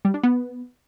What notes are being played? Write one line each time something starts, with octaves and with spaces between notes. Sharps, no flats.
G3
D4
B3